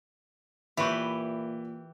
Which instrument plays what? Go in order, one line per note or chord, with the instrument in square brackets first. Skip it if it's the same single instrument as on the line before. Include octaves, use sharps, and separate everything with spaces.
[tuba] A#2 [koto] E3 G4 B4 [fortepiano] E4 C#6